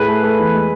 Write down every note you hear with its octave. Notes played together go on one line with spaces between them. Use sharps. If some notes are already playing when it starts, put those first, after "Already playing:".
Already playing: A2 G#4 B4
A3
A3
E2
G#3